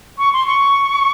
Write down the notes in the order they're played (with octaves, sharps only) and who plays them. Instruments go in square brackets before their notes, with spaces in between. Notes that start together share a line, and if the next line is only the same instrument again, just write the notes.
[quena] C#6
C6
C#6